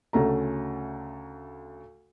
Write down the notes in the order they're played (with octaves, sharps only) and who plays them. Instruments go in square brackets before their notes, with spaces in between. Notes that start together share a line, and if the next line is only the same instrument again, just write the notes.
[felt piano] D2 C#3 A3 A#5